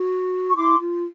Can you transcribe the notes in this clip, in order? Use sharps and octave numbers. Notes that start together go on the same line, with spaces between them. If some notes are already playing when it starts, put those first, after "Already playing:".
Already playing: F#4
C#6
E4 C6 D6
F4